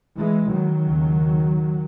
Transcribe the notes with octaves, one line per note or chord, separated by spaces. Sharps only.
E3 G#3
D#3 F#3
D#2 C#3